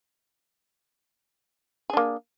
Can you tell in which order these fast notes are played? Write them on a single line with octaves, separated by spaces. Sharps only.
G#4 D4 A#3